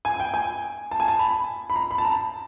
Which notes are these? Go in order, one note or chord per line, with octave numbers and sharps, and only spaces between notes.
G#5
G5
G#5
A5
G#5
A5
B5
B5
A#5
B5
A5
A#5